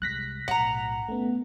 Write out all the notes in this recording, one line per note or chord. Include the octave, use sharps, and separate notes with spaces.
C2 G#3 F#6 A#6 B6
B1 A2 F#5 A#5
A3 B3 C#4